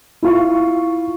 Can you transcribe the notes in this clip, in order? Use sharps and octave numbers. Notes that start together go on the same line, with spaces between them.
E4 F4 C#6